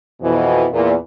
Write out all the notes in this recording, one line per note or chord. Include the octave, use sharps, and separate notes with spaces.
F2 B2 E3
E2 A#2